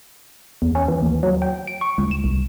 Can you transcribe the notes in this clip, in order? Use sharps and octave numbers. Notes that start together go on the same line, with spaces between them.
E2
C#4
E3
D#2
F#3
G5
D7
C#6
C#2
E7
C2